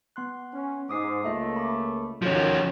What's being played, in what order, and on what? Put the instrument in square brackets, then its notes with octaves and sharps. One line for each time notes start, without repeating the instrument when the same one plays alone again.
[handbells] B3 C6 F#6
[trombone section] C#4
[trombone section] G#2 [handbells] D6 D#6 C7
[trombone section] C#2 A3 A#3 [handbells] F4 D#5 E5
[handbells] B5 D6
[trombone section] D#2 D#3 [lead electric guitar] F3 C#4 [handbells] F#4 A4 C#5